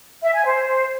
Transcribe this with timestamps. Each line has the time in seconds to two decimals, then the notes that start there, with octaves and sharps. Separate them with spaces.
0.23 E5
0.34 G#5
0.46 C5